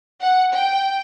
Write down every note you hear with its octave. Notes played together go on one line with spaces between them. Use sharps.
F#5
G5